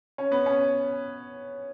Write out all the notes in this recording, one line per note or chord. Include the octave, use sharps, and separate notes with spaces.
C#4
B3
C#4